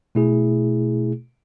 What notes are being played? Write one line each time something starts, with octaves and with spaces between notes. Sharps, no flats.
B2 A3 E4 G#4